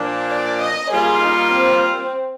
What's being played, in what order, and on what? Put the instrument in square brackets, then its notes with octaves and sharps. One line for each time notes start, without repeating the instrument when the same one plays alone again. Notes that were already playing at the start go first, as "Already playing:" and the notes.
Already playing: [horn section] A#2 F3 A#3 D4
[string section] D5
D#5
[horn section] G3 A#3 F4 [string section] G#4
[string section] D#4
C4